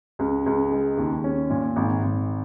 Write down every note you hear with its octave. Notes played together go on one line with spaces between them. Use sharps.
C#2
C#2
G#3
D#2
C#4
A#2
G#1
G#1